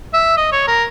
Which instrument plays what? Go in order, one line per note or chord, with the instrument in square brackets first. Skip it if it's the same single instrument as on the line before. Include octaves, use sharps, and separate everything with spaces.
[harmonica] E5
D#5
C#5
A#4